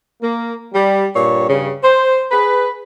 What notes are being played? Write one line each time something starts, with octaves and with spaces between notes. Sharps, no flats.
A#3
G3
G2 A#2 C#5
G2 C#3
C5
G#4 B4